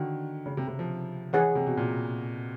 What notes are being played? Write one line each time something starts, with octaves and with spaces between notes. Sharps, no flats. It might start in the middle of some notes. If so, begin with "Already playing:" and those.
Already playing: D3 D#3 F#4
C#3
C3
C3
F3
E3 G#4 C#5 F#5
C3
B2
A#2